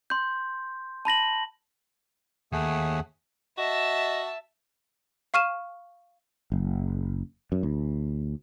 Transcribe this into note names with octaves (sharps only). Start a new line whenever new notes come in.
C6 G6
A5 B5 A#6 F#7
D#2 A3 G#4 F#5
F#4 D#5 E5 A5
F5 C#6 F6 D#7 E7
F#1
F#2
D2